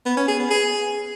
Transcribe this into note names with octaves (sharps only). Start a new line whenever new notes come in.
B3
C#4
G#4
B3
G#4